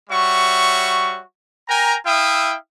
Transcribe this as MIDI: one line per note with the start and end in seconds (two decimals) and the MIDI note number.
0.10 1.22 55
0.10 1.22 66
0.10 1.22 73
0.10 1.22 76
0.10 1.22 85
1.69 1.97 70
1.69 1.97 79
1.69 1.97 80
1.69 1.97 82
2.06 2.56 64
2.06 2.56 76
2.06 2.56 77
2.06 2.56 79
2.06 2.56 87